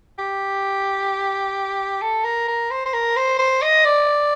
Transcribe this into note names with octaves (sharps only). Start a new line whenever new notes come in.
G4
A4
A#4
A#4
C5
C5
A#4
C5
C5
D#5
D5